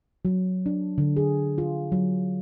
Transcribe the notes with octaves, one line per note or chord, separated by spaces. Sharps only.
F#3
D4
D3
G#4
F4
F#3